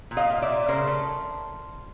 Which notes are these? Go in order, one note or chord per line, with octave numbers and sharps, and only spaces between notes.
A#2
D#5 F5
A#2
D5 E5
A#2
C#3 A#4 C5
A3